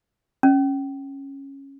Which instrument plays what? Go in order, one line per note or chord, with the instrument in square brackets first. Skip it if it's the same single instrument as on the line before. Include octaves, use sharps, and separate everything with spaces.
[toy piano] C#4